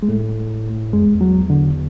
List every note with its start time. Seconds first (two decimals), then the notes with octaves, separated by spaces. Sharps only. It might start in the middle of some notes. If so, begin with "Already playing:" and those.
0.03 G#3
0.09 A2 A3
0.93 F#2 G#3
1.01 E2
1.15 E2
1.21 F#3
1.50 D3